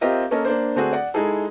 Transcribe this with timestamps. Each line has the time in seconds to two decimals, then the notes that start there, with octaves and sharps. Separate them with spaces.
0.01 C4 F4 G4 A#4 D#5 E5
0.31 A#3 C#4 A4 A#4 D#5
0.45 A#3 D4 C5
0.75 D3 A3 C4 D4 F#4 G#4
0.93 D5 F#5
1.14 G#3 D#4 E4 G#4 A4